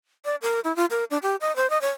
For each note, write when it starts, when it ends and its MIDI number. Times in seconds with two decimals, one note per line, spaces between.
0.25 0.36 74
0.42 0.60 70
0.64 0.74 64
0.76 0.85 65
0.90 1.04 70
1.11 1.18 62
1.23 1.36 67
1.41 1.54 75
1.56 1.69 72
1.70 1.80 75
1.81 1.90 73